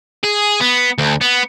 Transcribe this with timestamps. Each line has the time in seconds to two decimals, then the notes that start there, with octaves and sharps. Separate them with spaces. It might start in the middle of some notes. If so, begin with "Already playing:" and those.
0.23 G#4
0.60 B3
0.98 D2
1.21 B3